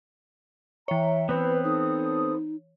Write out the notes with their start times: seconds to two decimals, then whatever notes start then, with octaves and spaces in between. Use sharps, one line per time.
0.88 E3 C#5 E5 G5 A#5
1.29 B3 C4 E4 B4
1.64 D#4 A4 D#6